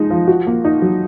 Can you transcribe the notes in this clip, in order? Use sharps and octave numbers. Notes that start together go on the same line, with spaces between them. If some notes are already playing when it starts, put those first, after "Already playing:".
Already playing: F3 G#3 D#4
F3
F#4
A#3
D#4
F#3